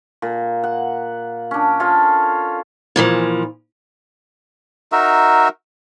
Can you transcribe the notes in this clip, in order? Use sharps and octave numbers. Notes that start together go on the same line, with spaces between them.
A#2
F#5
C#4 D4
F4 G#4 A4 C#5
A#2 E3 F3
D#4 F#4 A#4 E5